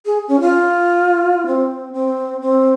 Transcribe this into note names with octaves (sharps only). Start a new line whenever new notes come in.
G#4
C#4
F4
C4
C4
C4